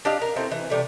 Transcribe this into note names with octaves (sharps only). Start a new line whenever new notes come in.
D4 G4 D#5 F5
A#4
A3 C4 E4
E3
C3 G3 A3